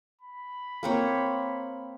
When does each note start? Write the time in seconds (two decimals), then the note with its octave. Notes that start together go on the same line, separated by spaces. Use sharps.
0.21 B5
0.83 A#3 C4 C#5